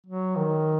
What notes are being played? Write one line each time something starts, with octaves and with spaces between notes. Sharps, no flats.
F#3
D#3